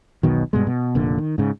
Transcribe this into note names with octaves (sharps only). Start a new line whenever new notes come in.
E1 B1 B2 D#3
G2 B2 G#3
B2
F1 A#2 D3
D#3
G#2 C#3